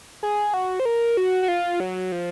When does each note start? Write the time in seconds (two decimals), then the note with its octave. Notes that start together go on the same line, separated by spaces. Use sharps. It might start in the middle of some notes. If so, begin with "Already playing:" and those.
0.23 G#4
0.54 F#4
0.80 C5
0.85 A#4
1.17 F#4
1.43 F#4
1.48 F4
1.80 F#3
2.12 F3